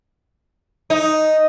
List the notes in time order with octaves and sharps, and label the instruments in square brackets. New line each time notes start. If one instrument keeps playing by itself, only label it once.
[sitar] D#4